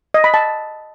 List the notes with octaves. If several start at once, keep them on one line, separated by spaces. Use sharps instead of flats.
D#5
B5
A5